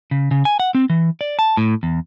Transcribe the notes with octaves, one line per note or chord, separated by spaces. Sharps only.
C#3
C#3
G#5
F#5
C4
E3
D5
A5
A2
E2